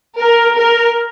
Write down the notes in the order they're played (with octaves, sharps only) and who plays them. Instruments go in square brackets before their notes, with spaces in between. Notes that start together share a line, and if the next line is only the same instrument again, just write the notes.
[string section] A#4
A#4